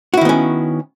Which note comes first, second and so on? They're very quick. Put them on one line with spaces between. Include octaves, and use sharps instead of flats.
F#4 E4 D#3 B3 C#4